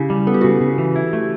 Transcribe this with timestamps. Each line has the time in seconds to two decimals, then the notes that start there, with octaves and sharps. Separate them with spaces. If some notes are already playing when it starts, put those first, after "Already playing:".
Already playing: C#3 E4 G4
0.10 G3
0.27 B3 A4
0.34 G4
0.41 C#3 F#4 A4
0.61 C#3
0.78 E3
0.96 E4
1.13 A3